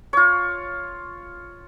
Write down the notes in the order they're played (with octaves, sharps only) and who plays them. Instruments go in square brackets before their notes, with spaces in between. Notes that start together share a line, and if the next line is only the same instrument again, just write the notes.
[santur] F4 C#5